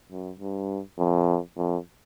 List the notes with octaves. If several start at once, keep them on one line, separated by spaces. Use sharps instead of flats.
F#2
G2
F2
F2